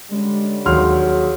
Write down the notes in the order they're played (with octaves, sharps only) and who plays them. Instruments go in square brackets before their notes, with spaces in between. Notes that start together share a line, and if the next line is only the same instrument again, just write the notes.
[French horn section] D3 G3 C#4 [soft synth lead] G#3
[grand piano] D#2 C6 F6 [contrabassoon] F#3 [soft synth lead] G#4